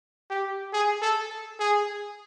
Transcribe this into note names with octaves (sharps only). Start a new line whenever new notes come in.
G4
G#4
A4
G#4